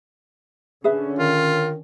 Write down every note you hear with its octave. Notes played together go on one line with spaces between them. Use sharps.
D3 C#4 G#4 B4 E5
D#3 F4